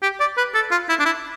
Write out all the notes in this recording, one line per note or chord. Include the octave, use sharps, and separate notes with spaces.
G4
D5
B4
A4
F4
E4
D4
E4